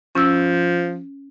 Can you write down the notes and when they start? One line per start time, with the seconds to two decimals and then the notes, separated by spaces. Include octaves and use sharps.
0.15 F3 C#4 E6